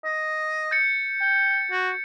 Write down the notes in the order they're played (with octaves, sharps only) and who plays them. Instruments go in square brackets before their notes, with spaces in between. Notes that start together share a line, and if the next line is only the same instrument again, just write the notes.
[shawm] D#5
[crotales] G6 A6 C#7
[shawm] G5
F#4